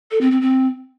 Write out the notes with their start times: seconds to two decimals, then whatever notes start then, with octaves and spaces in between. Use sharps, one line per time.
0.11 A4
0.21 C4
0.31 C4
0.41 C4